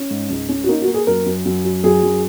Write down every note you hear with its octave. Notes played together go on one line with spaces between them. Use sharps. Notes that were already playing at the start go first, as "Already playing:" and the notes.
Already playing: C#4
G#2
C#2
C#4
F#4
A#3 D#4
F#4
A#3
G#4
F#2 A#4
F#2
F#2
F#3
F#2 G#4
F#2